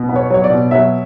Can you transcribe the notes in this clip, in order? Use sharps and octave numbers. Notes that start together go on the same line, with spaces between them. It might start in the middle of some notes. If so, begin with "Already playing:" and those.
Already playing: B2
B3
C#5
F#3 C#5
D5
B2
F#3 E5